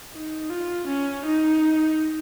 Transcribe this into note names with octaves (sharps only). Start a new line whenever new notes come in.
D#4
F4
C#4
D#4